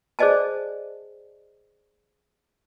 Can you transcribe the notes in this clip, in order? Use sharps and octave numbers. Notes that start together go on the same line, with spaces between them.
G#4 C5 D5 D#5 G#5 A5